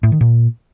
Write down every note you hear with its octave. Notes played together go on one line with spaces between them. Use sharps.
A2
D#3
A#2